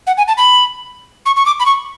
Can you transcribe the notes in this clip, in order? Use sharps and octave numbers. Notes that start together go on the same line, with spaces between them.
F#5
G#5
A5
B5
C#6
C#6
D6
B5
C#6